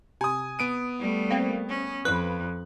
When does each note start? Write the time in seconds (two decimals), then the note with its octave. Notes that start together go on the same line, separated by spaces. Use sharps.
0.21 C3 G#5 D#6
0.59 B3 D7 D#7
1.00 G3 A3
1.31 A#3 C4
1.69 C#4
2.05 F2 B4 F#6